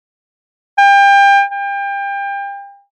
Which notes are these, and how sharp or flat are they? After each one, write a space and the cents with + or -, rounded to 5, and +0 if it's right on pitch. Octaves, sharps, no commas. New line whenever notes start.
G5 +30
G5 +30